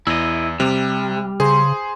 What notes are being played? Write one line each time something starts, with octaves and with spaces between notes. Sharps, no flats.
E2 E4 D#5
C3 G3
C#3 G#4 C5 A#5 C6